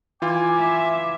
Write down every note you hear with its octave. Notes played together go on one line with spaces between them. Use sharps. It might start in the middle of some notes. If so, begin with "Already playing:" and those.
E3 F4 G#5 D6
E5